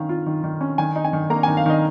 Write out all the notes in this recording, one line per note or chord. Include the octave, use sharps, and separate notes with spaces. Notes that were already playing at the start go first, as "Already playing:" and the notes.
Already playing: D#3 C#4 F5
F4
D#3
D#3
C#4
D#3 G#5
D#4
G#5
D#3
A#3 A#5
D#3 G#5
F5
D#3 D#5